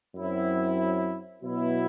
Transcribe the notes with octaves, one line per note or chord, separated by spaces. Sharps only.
F#2 F#3 C4 E4
B2 F#3 B3 E4